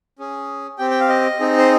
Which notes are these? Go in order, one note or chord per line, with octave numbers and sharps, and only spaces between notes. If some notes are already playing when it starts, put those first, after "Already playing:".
C#4 G#4
C4 G4 G5
G5
F5
D#5
C4 D#4 G#4
C5